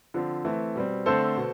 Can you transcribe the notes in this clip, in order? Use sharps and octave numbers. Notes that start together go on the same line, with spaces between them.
D3 F3 C4
E3 A3 C4
B2 G3 C4
D3 A3 C4 A4 C5
B2